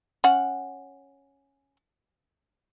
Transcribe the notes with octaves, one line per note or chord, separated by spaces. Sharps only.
C#4 F#5